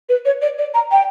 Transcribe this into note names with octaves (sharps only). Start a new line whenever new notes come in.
B4
C#5
D5
D5
A#5
G5